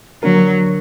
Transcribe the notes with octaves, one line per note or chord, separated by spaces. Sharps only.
D3 F#3 A#3 D4 A#4